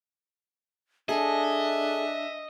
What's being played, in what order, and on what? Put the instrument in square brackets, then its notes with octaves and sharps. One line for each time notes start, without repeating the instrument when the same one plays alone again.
[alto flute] D4 [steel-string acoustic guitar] G#4 A4 [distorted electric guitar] D#5 [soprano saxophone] E5